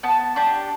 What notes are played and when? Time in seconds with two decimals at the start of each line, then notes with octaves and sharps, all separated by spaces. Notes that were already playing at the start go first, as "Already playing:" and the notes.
0.03 B3 A5
0.36 D4 G4